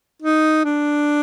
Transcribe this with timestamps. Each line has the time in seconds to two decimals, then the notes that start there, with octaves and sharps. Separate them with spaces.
0.22 D#4
0.65 D4